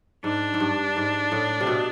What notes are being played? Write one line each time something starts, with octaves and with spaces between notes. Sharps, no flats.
G#2 D4
G#2
G2
G#2
A2
C3
B2